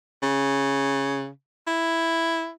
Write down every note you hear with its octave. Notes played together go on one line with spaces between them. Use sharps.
C#3
E4